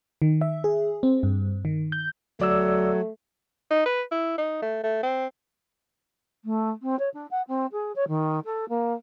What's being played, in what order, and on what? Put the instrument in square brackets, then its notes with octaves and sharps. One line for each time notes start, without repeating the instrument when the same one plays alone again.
[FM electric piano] D#3
E5
G#4
C4
G2
D#3
G6
[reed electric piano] D2 D5 E6 [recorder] F#3 [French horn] A3
[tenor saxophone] D#4
B4
E4
D#4
A3
A3
C4
[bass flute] A3
C4
C#5
D4
F#5
C4
G#4
C#5
D#3
A4
A#3